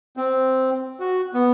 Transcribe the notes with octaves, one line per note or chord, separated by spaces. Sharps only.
C4
F#4
B3